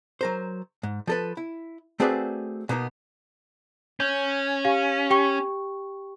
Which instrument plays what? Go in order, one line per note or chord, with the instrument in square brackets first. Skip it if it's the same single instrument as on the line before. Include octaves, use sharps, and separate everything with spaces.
[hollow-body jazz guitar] F#3 A#4 C5
G#2
F3 A4 B4
E4
A3 C4 F#4 G#4 B4 D5
B2 A#3 B3 D4 D#4
[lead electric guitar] C#4 [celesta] G6
[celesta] G4 F5
G4 G5 C#6